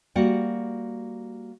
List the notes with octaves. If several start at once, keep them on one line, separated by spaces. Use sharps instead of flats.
G3 A#3 F#4 F#5